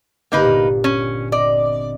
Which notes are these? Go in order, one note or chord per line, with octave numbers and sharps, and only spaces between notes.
G1 A#3 D#4 B4 D6 G6
A#2
C#4
C4 D5 D#5